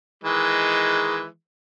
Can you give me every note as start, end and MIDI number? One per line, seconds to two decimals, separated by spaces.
0.24 1.26 51
0.24 1.26 52
0.24 1.26 56